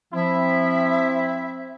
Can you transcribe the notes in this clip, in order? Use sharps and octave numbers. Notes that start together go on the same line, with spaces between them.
F3 C4 E4 E5